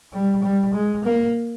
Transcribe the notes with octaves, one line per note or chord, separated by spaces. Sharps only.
G3
G3
G#3
A#3